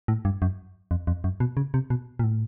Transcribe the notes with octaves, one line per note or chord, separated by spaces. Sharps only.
A2
G2
F#2
F2
F2
F#2
B2
C#3
C3
B2
A#2
A2